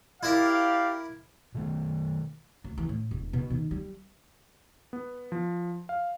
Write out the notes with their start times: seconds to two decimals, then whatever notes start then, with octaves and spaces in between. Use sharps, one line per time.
0.23 E4 G4 A#4 D5 F5
1.55 B2 D#3 A3
2.64 D2
2.78 E3
2.89 A2
3.11 E1
3.33 B2
3.50 D#3
3.71 G3
4.93 B3
5.32 F3
5.89 F5